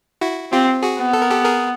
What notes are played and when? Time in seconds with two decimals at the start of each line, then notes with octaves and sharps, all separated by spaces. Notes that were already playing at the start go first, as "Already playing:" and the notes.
0.21 E4 F#4
0.52 C4 F4 G4
0.83 F#4 G#4
0.99 B3
1.13 A4
1.22 A#4
1.30 G4 A4
1.45 G#4 A#4